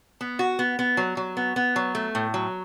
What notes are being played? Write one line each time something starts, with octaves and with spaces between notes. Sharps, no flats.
B3
F#4
B3
B3
F#3
F#3
B3
B3
F#3
A3
A2
F#3